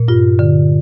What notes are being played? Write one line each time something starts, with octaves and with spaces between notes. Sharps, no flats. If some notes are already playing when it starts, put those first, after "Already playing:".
Already playing: A#2
G2 F4
D3